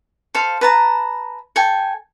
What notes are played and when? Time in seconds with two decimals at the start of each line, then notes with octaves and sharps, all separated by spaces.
0.34 A4 C5 F5
0.61 B4 A5 A#5
1.56 A4 G5 G#5